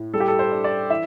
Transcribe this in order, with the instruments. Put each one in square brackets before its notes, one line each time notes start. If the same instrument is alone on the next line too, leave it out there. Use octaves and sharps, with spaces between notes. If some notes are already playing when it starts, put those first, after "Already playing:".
Already playing: [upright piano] A2
G3 A4
G4
A4
C5
D4
D5
E3 E5